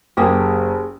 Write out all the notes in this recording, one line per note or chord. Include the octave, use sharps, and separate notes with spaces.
F#1 G4 G#4 A#4